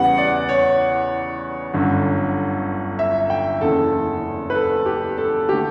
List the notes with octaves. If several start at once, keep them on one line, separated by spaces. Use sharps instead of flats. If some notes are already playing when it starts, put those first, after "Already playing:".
Already playing: E2 C#3 G3 B3 F#5
D5
C#5
G1 F#2 D3
E5
G5
F#1 E2 C#3 A4
B4
A4
G4
A4
D3 A3 G4